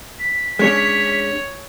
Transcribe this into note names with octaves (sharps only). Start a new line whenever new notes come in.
B6
G#3 C#4 D4 C#5